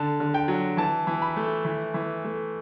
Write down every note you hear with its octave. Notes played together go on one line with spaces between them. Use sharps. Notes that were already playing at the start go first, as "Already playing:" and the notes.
Already playing: D3 A5
D3
G5
F#3
E3 A5
E3
B5
A3
E3
E3
A3